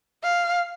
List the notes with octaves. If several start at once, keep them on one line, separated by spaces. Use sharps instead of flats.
F5